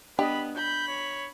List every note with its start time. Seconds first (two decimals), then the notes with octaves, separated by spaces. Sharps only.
0.19 B3 D4 G4 D#5 B5
0.57 B5 G6
0.88 C#5